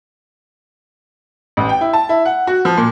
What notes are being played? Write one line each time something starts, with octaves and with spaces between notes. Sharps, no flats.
A1
G5
E4
A5
E4
F#5
F#4
F3
A#2